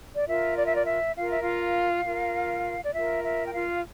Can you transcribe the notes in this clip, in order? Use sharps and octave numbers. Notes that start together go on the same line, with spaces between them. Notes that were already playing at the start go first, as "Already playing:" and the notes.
D5
F4 A#4 E5
D5
E5
D5
E5
F4 A#4 F5
E5
F4 F5
F4 A#4
D5
F4 A#4 E5
E5
G5
F4 F5